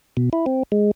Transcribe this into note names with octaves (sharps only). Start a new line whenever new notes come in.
B2
E4
C4
G#3